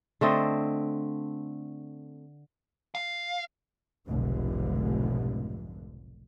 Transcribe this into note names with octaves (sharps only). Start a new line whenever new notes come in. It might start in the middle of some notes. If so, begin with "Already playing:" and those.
D3 A3 C4 D#5
F5
F1 B1 G#2 D3